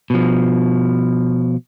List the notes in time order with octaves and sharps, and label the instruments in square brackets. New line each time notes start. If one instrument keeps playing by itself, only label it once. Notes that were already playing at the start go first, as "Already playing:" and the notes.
[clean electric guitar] B2 F3